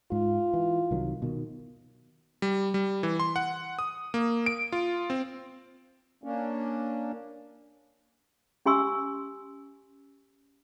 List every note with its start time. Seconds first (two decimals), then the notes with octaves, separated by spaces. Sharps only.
0.12 G#2 F4
0.54 E3
0.91 C2 D#3 F#3
1.22 B2 D#3
2.42 G3
2.74 G3
3.03 E3
3.20 C6
3.36 F#5
3.79 D#6
4.14 A#3
4.46 D7
4.72 F4
5.10 C4
6.23 A#3 C#4 D4
8.66 C#4 G4 G#5 C6 E6